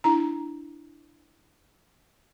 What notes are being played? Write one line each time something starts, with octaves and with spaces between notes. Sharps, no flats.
D4 E4 A#5